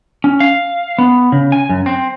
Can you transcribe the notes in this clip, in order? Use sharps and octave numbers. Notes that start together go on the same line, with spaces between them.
C#4
F5
B3
C#3
G#5
F#2
C4